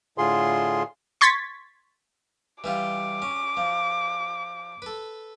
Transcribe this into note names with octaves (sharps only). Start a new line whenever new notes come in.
A2 D3 F4 G#4 C6
C6 C#6 G#6 A6 B6
E3 G3 F4 D6
C#4
F3
A4 B4